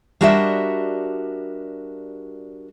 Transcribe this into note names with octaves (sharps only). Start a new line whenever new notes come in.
G3 D4 F#4 A#4 D#5 E5